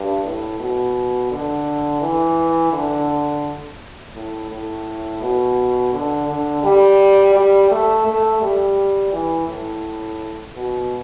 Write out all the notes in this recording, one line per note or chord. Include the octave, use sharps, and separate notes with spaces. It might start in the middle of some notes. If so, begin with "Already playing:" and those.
Already playing: G2
A2
B2
D3
E3
D3
A2
A2
B2
D3
D3
G3
G3
A3
A3
G3
E3
A2
B2